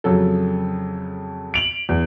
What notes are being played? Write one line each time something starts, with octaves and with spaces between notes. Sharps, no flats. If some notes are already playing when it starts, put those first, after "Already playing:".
F2 C#3 F#3 A4
D7 F7 F#7
E2